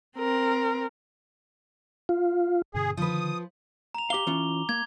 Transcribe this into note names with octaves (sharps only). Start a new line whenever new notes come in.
C4 A#4
F4
G2 B2 D3 G#4
D3 D#3 F3 B4 D#6
A#5 F7
G4 F5 D6 G7
E3 C#4 F4
A#3 G#6